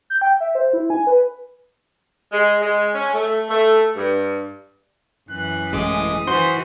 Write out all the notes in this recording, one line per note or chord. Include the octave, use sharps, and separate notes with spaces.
G6
G5
E5
C5
E4
G#5
B4
G#3
G#3
C#4
A3
A3
G2
F#2 E3 F#6
A1 G#3 D6 D#6
E3 F#4 C5